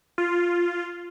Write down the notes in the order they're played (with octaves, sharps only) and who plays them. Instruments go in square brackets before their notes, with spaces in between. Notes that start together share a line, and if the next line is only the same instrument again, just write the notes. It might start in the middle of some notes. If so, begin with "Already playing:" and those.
[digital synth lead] F4